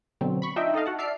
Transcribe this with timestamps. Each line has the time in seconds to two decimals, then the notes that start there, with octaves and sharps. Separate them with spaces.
0.21 B2 D3 F#3 C4
0.42 B5 C#6
0.56 D4 D#4 F4 D#5 E5 G5
0.74 D#4 A4 D#5 F5
0.86 F#4 F#5 A5
0.98 D5 E5 A5 F6 C7 D7